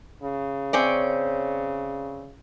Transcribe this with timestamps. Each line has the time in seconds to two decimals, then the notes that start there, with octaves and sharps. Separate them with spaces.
0.23 C#3
0.73 C4 C#4 D5